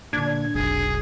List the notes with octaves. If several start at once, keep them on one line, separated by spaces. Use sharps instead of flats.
A#2 D3 D4 G#6
F1 B1 G#4